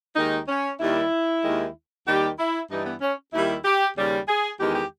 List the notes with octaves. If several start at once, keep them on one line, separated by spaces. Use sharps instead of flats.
D#2 D#3 G#3 D#4
C#4
D#2 D#3 G3 E4
D#2 D#3 G#3
D#2 D#3 G3 G4
E4
G2 E3 G3 D#4
B3
C#4
D#2 D#3 G3 E4
G4
D#2 C#3 G3
G#4
E2 D#3 G#3 G4
G4